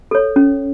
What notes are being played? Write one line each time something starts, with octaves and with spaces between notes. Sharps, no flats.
A4 C#5
C#4